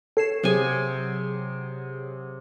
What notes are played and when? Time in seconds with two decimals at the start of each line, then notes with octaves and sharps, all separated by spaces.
0.17 A4 C#5 C7 E7
0.43 C3 F#3 G#4 G#5